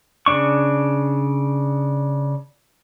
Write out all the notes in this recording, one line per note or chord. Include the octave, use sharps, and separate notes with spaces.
C#3 C#4 D4 C#6